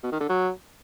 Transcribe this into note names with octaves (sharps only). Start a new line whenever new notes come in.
B2
D#3
D3
F#3